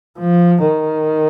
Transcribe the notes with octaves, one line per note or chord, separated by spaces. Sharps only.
F3
D#3